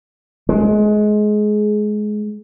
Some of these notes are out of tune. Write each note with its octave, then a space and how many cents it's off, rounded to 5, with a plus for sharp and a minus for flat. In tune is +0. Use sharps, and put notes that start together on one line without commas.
G#3 +20